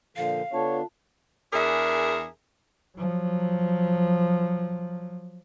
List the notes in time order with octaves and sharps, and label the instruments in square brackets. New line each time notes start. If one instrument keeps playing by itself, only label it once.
[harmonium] A#2 D3 F3 [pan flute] F5
[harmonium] D3 B3 D4 [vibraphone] F4 A5 [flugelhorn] C#5
[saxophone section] E2 D4 G#4 A#4 E5
[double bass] F3 F#3